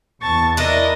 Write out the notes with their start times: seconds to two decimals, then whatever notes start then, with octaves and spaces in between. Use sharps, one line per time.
0.22 E2 A5 C#6 A6
0.57 D4 E4 A#4 D#5